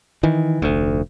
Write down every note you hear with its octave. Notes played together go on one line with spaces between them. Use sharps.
D#3 E3
F1 D2